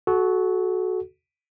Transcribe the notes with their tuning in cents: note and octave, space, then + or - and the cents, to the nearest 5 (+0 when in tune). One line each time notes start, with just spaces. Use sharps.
F#4 +0 A4 -30